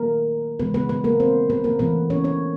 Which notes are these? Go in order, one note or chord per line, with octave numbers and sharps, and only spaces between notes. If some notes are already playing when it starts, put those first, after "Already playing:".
Already playing: D#3 F#3 A3 A#3 A#4
C#3 E3 G#3 B3 B4
B3 B4
B3 B4
A#3 A#4
C4 C5
B3 B4
A#3 A#4
C3 E3 A3 B3 B4
C#4 C#5
C#4 C#5